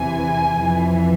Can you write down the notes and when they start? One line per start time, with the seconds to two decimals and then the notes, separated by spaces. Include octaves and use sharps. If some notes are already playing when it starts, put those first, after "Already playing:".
Already playing: E2 C3 E3 G#5
0.57 F2 E3